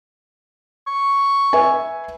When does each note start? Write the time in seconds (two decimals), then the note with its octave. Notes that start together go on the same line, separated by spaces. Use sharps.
0.87 C#6
1.53 B4 E5 G#5